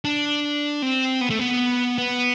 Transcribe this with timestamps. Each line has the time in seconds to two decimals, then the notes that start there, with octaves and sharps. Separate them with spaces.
0.05 D4
0.82 C4
1.21 B3
1.30 A3
1.39 B3
1.98 B3